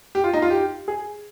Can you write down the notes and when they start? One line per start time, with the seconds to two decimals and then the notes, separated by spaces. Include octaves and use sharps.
0.15 G4
0.24 F4
0.33 D#4
0.42 F4
0.50 G4
0.88 G#4